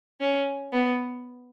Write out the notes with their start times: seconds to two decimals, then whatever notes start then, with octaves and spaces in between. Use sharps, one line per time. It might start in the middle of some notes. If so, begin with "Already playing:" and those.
0.21 C#4
0.73 B3